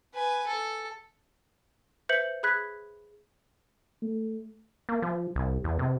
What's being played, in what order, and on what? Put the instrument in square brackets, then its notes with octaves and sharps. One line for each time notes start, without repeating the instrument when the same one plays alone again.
[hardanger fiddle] B4 G#5
A4
[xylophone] B4 C5 E5 G6 C#7 F#7
G#4 B5 F#6 G#6 B6
[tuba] A3
[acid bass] A#3
F3
C2
E2
C3